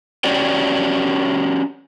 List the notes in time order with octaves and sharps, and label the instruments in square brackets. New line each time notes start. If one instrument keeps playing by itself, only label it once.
[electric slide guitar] C#4 F#4 G4 C#5 D5 G5